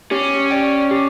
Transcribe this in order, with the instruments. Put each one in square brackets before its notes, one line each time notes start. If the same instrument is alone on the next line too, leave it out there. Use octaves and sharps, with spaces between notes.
[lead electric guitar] C#4 [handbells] G4
[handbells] D5 G5
G4